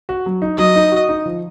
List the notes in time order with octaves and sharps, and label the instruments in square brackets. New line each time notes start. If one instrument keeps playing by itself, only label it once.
[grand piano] F#4
F#3
D#4
[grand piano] F#3 [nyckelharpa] D#5
[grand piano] D#4
F#4
D#4
F3